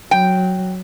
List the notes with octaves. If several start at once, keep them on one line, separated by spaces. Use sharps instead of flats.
F#3 G5